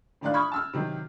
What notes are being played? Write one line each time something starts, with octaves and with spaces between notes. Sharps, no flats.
A2 D#3 D4 D5 F5 F#6
B5 C#6 D#6 F6 G#6
A5 E6 F6
C3 D#3 F#3